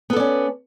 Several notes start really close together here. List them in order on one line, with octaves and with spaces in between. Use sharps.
B3 A4 D5 C#4